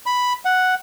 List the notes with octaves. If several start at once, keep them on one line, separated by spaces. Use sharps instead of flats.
B5
F#5